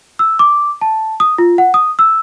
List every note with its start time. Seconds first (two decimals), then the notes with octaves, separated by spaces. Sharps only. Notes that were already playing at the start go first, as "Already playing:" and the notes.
0.19 E6
0.39 D6
0.81 A5
1.20 D#6
1.38 F4
1.58 F#5
1.74 D#6
1.99 E6